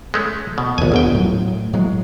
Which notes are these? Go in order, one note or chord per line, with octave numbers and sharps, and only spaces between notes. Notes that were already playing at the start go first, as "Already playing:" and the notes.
G#3 A3 C#4
B2
A#1 D#2 G#3 B3 G#5
G1 G#2 G5
A2 F#3
A2 F#3 G#3